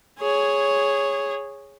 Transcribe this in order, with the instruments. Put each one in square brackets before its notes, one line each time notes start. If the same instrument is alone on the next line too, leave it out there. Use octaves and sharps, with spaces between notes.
[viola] G#4 C#5